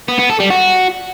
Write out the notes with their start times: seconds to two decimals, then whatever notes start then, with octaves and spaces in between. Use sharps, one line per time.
0.08 B3
0.19 B3
0.29 A4
0.40 G3
0.50 F#4